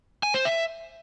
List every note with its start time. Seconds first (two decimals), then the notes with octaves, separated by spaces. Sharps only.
0.23 G#5
0.34 C5
0.45 E5